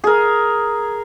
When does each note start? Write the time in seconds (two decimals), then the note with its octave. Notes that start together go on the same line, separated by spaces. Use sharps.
0.04 G#4 A#4